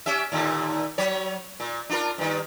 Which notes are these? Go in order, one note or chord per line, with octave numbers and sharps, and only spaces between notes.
C#4 G4 E5
D#2 A#2 D3
F#3 C#5
A#2
D4 F4 A#4
G2 D#3